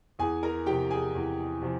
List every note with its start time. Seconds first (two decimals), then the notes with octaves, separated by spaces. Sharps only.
0.19 E2 G#4 G#5
0.43 A#4 A#5
0.66 C3 F3 G4 G5
0.91 G#4 G#5
1.15 E2
1.61 C3 F3